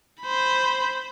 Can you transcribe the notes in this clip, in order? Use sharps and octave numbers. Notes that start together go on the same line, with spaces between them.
C5 B5